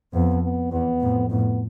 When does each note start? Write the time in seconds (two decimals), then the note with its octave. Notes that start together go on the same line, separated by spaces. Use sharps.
0.14 F2 B3
0.43 B3
0.71 E2 B3
1.01 F2 A2
1.29 F2 A2 B3